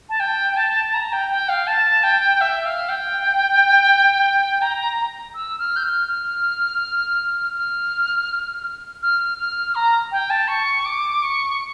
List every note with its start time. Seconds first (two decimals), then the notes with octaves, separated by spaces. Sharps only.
0.09 A5
0.20 G5
0.57 A5
0.94 A#5
1.12 G5
1.31 G5
1.49 F5
1.67 A5
2.03 G5
2.41 E5
2.65 F5
2.89 G5
4.62 A#5
5.34 E6
5.59 F6
5.76 G6
5.83 F6
6.08 F6
7.54 F6
9.02 F6
9.38 F6
9.75 A#5
10.12 G5
10.30 A5
10.48 C#6
10.85 D6
11.23 C#6